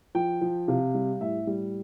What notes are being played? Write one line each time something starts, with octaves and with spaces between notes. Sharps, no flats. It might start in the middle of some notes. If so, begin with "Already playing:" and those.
F3 G5
F3
C3 F5
G3
A2 E5
G3